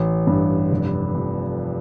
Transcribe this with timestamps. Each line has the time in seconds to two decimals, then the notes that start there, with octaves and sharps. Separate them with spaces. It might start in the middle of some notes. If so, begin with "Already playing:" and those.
Already playing: A1
0.27 G2
0.71 F1
1.15 F2